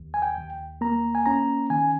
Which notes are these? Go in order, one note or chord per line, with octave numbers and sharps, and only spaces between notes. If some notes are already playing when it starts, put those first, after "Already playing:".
Already playing: D#2
G#5
G5
D#2
A#3 A#5
G#5
C#4 A#5
D#3 G#5